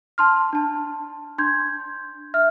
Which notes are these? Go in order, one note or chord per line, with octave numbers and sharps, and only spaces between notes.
A5 C6 F6
D4 A5
D4 C6 G6 G#6
E5 F6